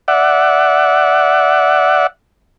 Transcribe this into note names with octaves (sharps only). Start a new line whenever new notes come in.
D5 E5 F#5